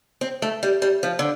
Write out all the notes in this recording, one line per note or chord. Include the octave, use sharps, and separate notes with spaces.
C4
A3
G3
G3
F3
D3